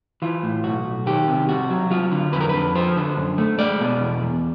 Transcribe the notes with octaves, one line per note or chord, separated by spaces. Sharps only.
E3 F4
A2
B1 F#4
B1
D#3 G4
C3
C2 F#4
F#3
F#3 F4
D3
F2 B4
A#4
F2 B4
F3 C5
D3
F#2
A3
G#3 D5
B2
E2
E2